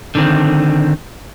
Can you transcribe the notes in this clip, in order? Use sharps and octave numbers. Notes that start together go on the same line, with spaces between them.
D3 D#3 C4